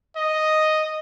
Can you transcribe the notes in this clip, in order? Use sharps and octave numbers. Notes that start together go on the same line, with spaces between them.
D#5